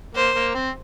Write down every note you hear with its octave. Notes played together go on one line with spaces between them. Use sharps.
A#3 C5
A#3
C4